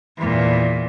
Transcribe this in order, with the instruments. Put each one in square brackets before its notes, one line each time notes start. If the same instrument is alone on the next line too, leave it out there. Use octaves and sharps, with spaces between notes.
[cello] E2 A#2